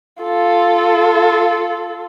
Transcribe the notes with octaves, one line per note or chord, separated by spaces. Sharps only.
F4 A4